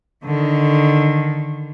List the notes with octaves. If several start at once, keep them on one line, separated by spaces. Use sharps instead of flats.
D3 D#3